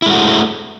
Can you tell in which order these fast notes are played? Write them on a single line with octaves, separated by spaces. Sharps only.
E4 G#3 F#4 A3